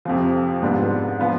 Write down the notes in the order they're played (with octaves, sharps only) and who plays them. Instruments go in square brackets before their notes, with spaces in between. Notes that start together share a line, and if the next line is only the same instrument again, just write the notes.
[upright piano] F2 C3 F3
G#2 G3 B3 D4 F4
F3 B3 D4 F4